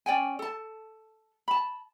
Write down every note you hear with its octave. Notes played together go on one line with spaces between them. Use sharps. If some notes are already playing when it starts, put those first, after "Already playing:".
C#4 D5 G5 G#5
A4 A5
A5 B5